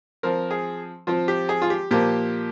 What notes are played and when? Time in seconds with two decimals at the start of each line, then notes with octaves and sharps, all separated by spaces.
0.23 F3 C4 A#4
0.51 G#4
1.07 F3 C4 F4
1.28 G4
1.49 G#4
1.62 F4
1.70 G4
1.91 A#2 F3 A#3 G4